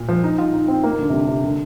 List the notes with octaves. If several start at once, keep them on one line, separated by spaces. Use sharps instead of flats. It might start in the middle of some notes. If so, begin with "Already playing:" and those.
Already playing: A#2
F3
D#4
F4
D#4
C4
A#3
D3
C3
D3
C3
D3